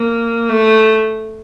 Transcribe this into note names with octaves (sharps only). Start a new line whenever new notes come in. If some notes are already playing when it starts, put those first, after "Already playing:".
Already playing: A#3
A3